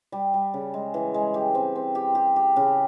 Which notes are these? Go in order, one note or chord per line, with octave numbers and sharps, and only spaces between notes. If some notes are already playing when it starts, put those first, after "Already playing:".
G3
G3
C#3
G#3
E3
G#3
G4
C4
C4
G4
G4
G4
C#3